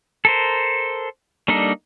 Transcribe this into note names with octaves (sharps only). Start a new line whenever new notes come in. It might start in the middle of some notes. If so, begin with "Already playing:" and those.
A4 A#4 C5
G3 A#3 D4 D#4 A4